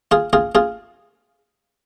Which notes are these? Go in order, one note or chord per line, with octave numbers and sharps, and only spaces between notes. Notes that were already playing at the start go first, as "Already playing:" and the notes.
F4 G#4
F4 G#4
F4 G#4